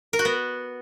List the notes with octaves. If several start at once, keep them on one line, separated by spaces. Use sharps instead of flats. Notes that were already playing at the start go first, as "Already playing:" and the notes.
A#4
F#4
B3